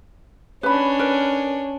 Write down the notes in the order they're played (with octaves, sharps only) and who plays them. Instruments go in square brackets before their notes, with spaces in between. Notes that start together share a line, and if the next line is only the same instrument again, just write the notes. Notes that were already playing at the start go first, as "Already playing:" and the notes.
[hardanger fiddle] C#4 D4 [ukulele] B4 B5
[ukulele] A#4 B4